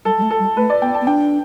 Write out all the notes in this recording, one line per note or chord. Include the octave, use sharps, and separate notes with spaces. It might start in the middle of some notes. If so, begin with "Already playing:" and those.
G3 A4
G3
A3
A4
G3
A3 B4
D5
B3 G5
A5
B3
D4 G5